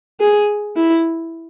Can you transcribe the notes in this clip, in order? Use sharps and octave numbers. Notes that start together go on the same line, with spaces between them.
G#4
E4